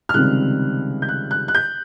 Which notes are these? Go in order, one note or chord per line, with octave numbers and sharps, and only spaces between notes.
F6
C#2 C3 D#3 G3 C4 F#6
G6
F#6
F#6
F#6
G6